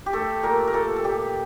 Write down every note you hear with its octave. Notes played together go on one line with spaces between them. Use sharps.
G4
A3 A4
A#2 A#4
A#4
A#2 A4
A4
A#2 G4